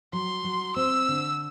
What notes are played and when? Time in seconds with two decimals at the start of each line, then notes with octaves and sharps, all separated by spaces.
0.13 F#3 C6
0.44 F#3
0.76 C4 E6
1.08 D3